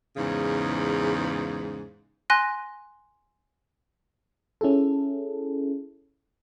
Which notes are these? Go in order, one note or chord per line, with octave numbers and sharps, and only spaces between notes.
E2 G#2 C#3
G#5 C6 F#6 A#6
C#4 E4 G#4 A4